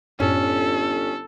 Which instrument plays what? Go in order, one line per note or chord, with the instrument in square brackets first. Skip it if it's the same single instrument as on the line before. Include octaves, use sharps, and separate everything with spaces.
[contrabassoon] G1 [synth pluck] F#2 A2 [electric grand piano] C#4 [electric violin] A4